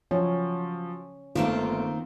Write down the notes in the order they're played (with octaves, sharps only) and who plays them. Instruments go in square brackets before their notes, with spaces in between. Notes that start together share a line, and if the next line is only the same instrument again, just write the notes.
[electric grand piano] F3 F#3 [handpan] C#4
[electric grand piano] G1 A3 [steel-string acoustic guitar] D#3 A#3 C4 [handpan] F4